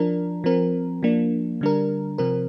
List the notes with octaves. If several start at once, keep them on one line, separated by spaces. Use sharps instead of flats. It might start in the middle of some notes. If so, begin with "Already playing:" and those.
Already playing: F3 D4 A#4
F3 C4 A#4
F3 A#3 D4
D3 G3 D4 A#4
C3 F3 C4 A#4